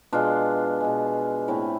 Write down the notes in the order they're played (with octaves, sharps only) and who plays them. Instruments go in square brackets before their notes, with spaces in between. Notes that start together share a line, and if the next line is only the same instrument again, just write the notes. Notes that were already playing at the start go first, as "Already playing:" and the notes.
[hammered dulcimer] B2 G#3 D4 F4
B2 G#3
A2 E3 A3 C4 E4